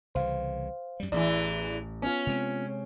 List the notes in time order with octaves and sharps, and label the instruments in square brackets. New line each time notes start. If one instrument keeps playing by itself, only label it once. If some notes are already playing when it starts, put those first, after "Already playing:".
[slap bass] C2 C#3 E3 [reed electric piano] C5 F5
[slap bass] F#2 G3
[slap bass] A1 [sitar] E2 E3 [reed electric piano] D5
[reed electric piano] B3 F4 [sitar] C#4
[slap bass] C3 G#3 C4